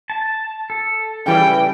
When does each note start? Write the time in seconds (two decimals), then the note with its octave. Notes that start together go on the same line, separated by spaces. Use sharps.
0.10 A5
0.70 A4
1.26 C#3 E3 G3 G5